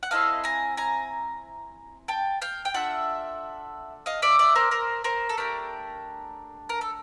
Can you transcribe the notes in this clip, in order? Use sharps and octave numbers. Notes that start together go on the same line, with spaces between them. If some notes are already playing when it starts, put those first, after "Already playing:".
F#5
C4 E4 A4 D#5 F5
G#5 A#5
G#5 A#5
G5 A5
F5 G5
G5
D4 F4 A4 E5 F#5
D#5 F5
D5 E5
D5 E5
A#4 C5
A#4 C5
A#4 C5
A4
A3 D4 G4 A#4
A#4
A4